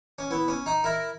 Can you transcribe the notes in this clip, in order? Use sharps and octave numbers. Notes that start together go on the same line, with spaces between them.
C#4
B3 E4
C#4
D#4
E4 A#4